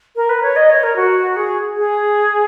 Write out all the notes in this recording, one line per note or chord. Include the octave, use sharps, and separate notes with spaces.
A#4
B4
C#5
D#5
C#5
A#4
F#4
G#4
G#4